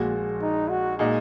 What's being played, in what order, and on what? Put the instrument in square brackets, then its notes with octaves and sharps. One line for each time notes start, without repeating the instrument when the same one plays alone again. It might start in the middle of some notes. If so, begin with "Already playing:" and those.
Already playing: [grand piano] A#1 A#2 G#3 F#4
[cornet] D#4
F#4
[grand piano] A#2 G#3 D#4